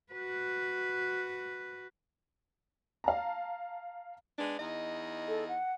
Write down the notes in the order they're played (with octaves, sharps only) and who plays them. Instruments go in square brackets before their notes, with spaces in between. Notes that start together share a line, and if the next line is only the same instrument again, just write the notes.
[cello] F#4 B4
[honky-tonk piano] F5 A5 A#5
[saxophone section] G#3 B3 D4
E2 D#4 D#5
[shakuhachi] A4
F#5